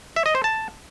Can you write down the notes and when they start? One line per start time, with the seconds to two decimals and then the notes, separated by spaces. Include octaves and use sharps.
0.16 E5
0.26 D#5
0.35 C5
0.44 A5